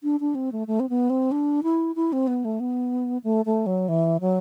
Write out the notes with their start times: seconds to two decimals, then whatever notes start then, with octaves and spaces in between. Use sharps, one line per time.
0.03 D4
0.20 D4
0.35 C4
0.52 A3
0.67 A3
0.80 C4
0.89 B3
1.10 C4
1.32 D4
1.63 E4
1.96 E4
2.13 C4
2.27 B3
2.45 A3
2.60 B3
3.24 A3
3.46 A3
3.66 F#3
3.89 E3
4.21 F#3